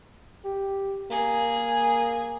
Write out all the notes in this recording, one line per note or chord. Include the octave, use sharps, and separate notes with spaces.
G4
A#3 G#4